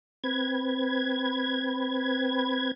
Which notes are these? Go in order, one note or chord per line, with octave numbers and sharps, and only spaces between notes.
C4 B4 G#6